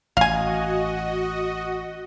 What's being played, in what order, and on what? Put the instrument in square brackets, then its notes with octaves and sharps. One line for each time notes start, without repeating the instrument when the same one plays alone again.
[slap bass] A1 [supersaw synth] F#4 D#5 [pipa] F5 G#5